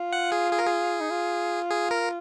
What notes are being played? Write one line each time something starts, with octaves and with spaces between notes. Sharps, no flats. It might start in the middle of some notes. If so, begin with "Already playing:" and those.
Already playing: F4
F#5
G#4
G#4
A#4
G#4
D#4
F4
G#4
A#4